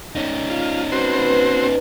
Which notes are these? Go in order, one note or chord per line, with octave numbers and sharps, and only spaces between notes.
C#4 D#4
F4
C4 F#4 B4 C5